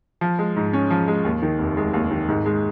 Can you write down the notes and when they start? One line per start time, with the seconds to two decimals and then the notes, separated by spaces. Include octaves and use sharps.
0.21 F3
0.39 G#3
0.56 G#2
0.73 C#4
0.90 F3
1.08 G#3
1.25 D#2
1.42 D#3
1.59 F1
1.77 G#3
1.94 D#2
2.11 D#3
2.28 G#2
2.45 G#3